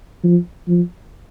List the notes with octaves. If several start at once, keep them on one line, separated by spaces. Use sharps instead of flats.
F3
F3